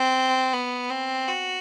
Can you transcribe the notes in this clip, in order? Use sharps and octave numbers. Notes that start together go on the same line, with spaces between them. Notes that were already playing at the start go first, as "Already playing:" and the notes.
Already playing: C4
B3
C4
F#4